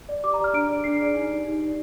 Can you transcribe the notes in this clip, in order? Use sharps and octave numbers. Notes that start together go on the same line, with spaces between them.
D5
G4 D6
A#5
D5
F6
D4 D7
G#4 D5
D4 C7
G#4 D5
D#4
G4 D5
D#4
G4 D5